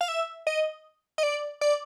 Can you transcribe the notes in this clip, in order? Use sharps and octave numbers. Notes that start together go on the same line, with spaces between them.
F5
E5
D#5
D#5
D5
D5